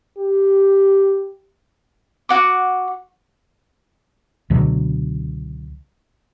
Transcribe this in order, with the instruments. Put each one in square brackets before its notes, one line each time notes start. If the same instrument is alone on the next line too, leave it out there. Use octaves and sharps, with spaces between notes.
[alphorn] G4
[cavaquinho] F#4 F#5 D6
[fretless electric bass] C#2 B2 D3 F#3